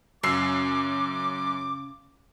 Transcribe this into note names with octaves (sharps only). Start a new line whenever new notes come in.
F#2 C#3 D6 E6 C7